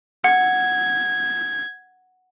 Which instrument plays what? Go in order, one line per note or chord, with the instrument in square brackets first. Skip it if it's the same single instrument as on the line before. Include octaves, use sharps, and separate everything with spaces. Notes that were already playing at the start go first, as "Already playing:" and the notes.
[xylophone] F#5 [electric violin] G#6